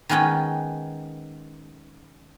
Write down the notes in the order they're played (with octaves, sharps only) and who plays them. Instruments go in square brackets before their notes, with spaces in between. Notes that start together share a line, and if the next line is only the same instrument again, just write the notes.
[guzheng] D#3 G#3 B3 C#4 G5